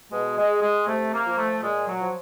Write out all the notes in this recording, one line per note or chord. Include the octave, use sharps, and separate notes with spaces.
B2 G#3
G#3
G#3
C3 A3
A#3
F3
A3
A#2 G#3
F#3
F3